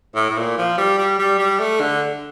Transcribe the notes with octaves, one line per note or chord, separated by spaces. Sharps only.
A2
A2
A#2
F3
G3
G3
G3
G3
A3
D3